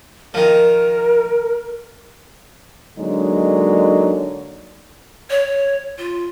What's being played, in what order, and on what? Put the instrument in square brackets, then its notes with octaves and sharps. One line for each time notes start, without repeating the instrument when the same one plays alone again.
[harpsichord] D#3 F3 [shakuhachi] A#4
[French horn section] D3 F#3 G#3 A#3 D4 D#4
[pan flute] C#5
F4